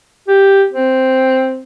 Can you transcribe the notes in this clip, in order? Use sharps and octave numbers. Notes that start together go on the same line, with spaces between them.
G4
C4